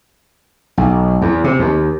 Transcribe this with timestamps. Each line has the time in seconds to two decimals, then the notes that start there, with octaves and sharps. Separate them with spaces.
0.77 B1
1.22 E2
1.44 C3
1.59 D#2